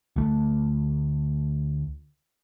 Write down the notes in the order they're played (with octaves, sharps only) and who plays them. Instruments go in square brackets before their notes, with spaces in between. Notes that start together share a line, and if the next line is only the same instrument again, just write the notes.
[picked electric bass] D2 A3